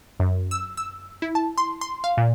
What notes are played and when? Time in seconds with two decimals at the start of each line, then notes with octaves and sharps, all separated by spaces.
0.20 F#2
0.51 E6
0.77 E6
1.22 E4
1.35 A5
1.58 C6
1.81 C6
2.04 F5
2.17 A#2